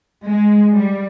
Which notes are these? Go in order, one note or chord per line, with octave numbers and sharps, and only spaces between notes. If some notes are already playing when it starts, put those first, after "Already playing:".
G#3
G3